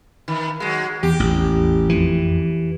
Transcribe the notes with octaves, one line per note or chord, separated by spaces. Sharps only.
D#3
F#3 G#3
E2 G4
A1
F2 E3